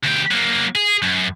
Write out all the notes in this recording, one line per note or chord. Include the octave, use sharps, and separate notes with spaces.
D2 G4
F#3 A#3
G#4
F#2